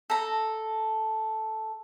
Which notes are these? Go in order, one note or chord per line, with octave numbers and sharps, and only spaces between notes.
A4 A#5